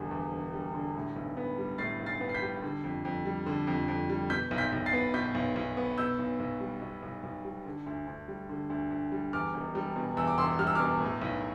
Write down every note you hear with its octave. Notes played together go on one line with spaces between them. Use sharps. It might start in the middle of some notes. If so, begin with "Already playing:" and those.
Already playing: E1 E2 D3 G3
E2
E1
G3
D3
A2
B1
B3
G3
A2 A6 C7
B1
A6 C7
B3
C7
G6 B6
G3
D3
F2
F2
G3
D3
F2
F2
G3
B2 G6 B6
B1
G6 B6
B1
A6 C7
B3
B2 G6 B6
B1
B1
B3
B2 E6 G6
B1
B1
G3
B2
B1
B1
G3
D3
D2
D2
G3
D3
D2
D2
G3
E2 D6 F6
E1
G3
B2
E2 E6
D6
E1 C6 E6
G3 F6
E6
B2 D6 F6
A2
B1